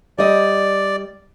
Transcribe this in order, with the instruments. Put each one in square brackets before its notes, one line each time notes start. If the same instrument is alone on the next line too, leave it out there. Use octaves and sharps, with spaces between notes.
[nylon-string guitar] G3 D#5 [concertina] D5